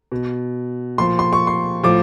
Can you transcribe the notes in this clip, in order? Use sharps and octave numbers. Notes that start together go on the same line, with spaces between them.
B2
A#2 F3 C6
C6
C#6
C6
A2 F3 D6